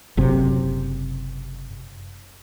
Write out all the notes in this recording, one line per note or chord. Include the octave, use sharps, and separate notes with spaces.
F#1 F#2 C3